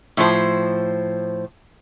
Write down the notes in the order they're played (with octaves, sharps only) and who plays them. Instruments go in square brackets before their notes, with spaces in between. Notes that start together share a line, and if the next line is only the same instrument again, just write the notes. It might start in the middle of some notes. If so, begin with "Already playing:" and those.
[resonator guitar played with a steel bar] A2 F3 C5